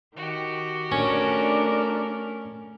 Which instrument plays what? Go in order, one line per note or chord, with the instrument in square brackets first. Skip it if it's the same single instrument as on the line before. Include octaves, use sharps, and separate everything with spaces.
[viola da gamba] D#3 [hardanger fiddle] F#4 G4
[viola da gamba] A3 A#4 [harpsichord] C#4 [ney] D4